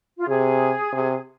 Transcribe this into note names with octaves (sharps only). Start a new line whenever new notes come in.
F4
C3 G#4
C3